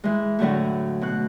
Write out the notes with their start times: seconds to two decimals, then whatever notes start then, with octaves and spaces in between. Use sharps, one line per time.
0.04 E3 G#3
0.39 A2 D3 F#3 A3
1.01 B2 F#6